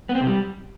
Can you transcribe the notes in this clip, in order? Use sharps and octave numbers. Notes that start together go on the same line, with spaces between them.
B3
C4
C3
G3